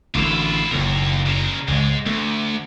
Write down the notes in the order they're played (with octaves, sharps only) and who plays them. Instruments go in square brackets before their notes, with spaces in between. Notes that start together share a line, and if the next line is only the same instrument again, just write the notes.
[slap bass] A1 D3 A3 [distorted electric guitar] E4 F4
[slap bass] F#1 A2 [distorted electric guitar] D#2 A#4
[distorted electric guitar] C#3 A#4
[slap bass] C#2 [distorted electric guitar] G#2 G#3
[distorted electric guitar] D2 [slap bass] A3